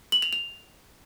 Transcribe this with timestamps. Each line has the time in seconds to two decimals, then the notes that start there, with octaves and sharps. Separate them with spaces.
0.12 F#7
0.22 F7
0.33 F7